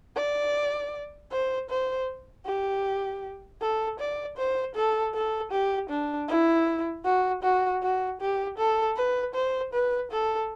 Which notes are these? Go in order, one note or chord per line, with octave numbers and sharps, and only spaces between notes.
D5
C5
C5
G4
A4
D5
C5
A4
A4
G4
D4
E4
F#4
F#4
F#4
G4
A4
B4
C5
B4
A4